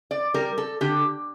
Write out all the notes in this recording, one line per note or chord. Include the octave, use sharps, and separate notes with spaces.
D5
G3 A#4
A4
D3 G4